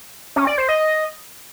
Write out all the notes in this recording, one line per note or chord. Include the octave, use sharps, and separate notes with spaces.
C#4
D5
C5
D#5